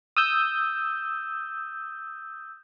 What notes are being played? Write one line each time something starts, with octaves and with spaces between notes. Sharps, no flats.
D#6 E6 G6